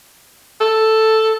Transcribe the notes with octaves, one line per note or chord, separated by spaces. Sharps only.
A4